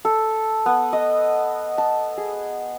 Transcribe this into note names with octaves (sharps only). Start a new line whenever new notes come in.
A4
B3
D#5
A5
G#4